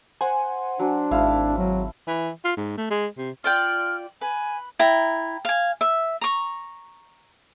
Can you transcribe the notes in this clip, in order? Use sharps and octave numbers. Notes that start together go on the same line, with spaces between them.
C5 F#5 G#5
F#3 D4
G#1 E4 F5 A5
F#3
E3
F4
G#2
A3
G#3
C3
F4 D5 G5 F6
B4 G#5
E4 G5 A#5
F5 G#5
E5
A#5 C#6